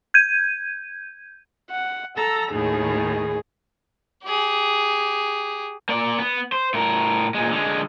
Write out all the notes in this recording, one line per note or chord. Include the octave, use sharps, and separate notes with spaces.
G6 G#6 D#7
F#5
A4 A5 A#5 E6
D#2 A2 D#3 G#4
G4 G#4
A#3 D5
B3
C5
A2 A#4
A#2 G#3
D3 G#3